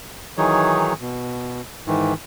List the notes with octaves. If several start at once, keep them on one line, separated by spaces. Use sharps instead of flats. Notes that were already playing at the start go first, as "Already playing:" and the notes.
D#3 E3 F#3 D#4 G#4 C#5
B2
G#2 D#3 E3